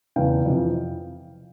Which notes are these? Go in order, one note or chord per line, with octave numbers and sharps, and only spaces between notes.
E2 C#3 E3 F5 G5
F2 C3 E3